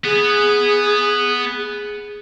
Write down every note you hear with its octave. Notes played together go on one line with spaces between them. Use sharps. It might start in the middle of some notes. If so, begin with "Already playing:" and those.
B3 G#4